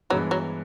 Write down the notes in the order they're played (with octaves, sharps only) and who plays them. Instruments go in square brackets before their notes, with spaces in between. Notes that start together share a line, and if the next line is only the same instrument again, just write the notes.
[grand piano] G2 E3 G#3 B3 [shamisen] F#3
[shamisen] F#3